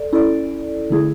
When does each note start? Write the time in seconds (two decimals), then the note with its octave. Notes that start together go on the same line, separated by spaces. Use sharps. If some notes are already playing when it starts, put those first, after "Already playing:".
Already playing: A4 D5
0.12 C#4 E4 A4 D5
0.90 D3 A3 E4 G#4